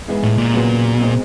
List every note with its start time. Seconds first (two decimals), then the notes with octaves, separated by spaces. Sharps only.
0.08 G#2 E3 G#3 B3 E4
0.23 A2
0.38 A#2
0.54 E2 C#3 F#3 B3
0.99 B1 B2 G#3 C4